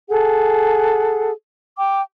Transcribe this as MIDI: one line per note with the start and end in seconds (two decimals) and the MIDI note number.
0.09 1.31 68
0.09 1.31 69
0.09 1.31 78
1.78 2.00 79
1.78 2.00 86